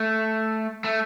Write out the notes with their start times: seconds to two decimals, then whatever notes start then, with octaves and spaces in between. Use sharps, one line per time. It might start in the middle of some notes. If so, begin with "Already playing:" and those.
Already playing: A3
0.84 A3